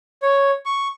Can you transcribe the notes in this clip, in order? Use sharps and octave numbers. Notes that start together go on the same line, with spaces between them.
C#5
C#6